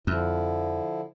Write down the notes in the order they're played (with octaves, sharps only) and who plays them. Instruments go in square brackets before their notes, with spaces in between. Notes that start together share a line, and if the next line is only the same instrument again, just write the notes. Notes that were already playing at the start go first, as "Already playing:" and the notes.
[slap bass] F2 [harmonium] D3 F3 E4